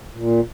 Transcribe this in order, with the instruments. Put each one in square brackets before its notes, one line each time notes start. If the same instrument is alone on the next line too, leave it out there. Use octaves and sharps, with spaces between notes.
[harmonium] A#2